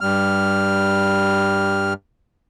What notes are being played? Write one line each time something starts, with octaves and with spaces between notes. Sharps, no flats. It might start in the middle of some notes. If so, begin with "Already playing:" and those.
G2 G3 F6